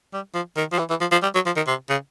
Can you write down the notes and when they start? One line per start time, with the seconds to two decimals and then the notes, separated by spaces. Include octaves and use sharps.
0.13 G3
0.34 F3
0.57 D#3
0.72 F3
0.79 E3
0.90 E3
1.01 F3
1.12 F3
1.23 G3
1.35 F#3
1.46 F3
1.56 D#3
1.67 C3
1.90 C#3